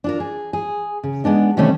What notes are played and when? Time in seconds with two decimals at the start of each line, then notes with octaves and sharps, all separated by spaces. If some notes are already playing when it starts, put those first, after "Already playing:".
0.04 D4 F4 A#4
0.20 G#4
0.53 G#4
1.03 C#3
1.24 G#3 B3 D4 D#4
1.57 C3 D#3 G3 A3 C#4